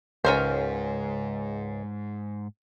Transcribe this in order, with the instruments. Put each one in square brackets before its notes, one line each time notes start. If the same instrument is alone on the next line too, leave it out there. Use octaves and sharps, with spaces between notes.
[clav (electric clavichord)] C#2 [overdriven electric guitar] G#2 [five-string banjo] C#4 A#4 C5